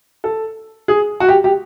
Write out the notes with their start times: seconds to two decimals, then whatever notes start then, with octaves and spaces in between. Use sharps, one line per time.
0.24 A4
0.88 G#4
1.20 F#4
1.29 G4
1.44 G4